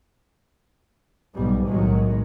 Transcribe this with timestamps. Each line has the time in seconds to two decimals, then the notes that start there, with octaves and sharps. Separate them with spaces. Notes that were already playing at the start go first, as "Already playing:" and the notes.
1.34 B1 G#2 G3
1.67 B1 A2 D#3 F#3 G#3